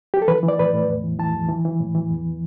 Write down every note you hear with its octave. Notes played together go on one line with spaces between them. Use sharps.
G4
A4
E3 B4
E3
D5
A2 B4
A2
E2
E3
E3 A5
E2
E3
E3
A2
E3
E2